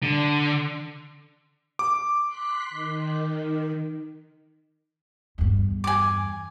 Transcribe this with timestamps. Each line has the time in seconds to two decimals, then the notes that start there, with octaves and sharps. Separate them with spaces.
0.03 D3
1.79 D6
2.24 C6 F#6 B6
2.70 D#3
5.38 E2 G2
5.84 G#5 D6